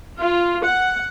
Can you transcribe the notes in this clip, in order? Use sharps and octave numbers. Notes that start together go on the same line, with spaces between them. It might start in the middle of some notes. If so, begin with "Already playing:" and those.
F4
F#5